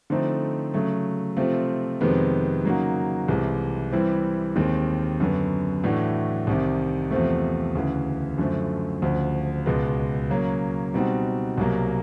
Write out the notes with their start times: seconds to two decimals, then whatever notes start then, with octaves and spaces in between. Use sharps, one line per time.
0.10 D3 F3 A3 C4 D#4
0.74 C#3 F#3 A3
1.37 C3 F3 A3 C4 F4
2.01 F2 C3 D#3 G#3 B3
2.65 C#3 F#3 A#3 D#4 F#4
3.28 C2 C3 E3 G#3
3.92 C3 E3 G3 C4 E4
4.56 D#2 D#3 G#3 C4
5.20 F#2 D3 F#3 B3
5.84 A2 E3 A3 D4 F#4
6.47 C2 C3 D#3
7.11 E2 C3 F3 A3
7.75 D2 C#3 E3
8.38 F#2 D3 F3 A3
9.02 D2 C#3 F3
9.66 C#2 B2 G#3 B3
10.30 C#3 F#3 A#3 C#4
10.94 B2 G3 C4 D#4 F#4
11.58 C2 B2 F#3 A#3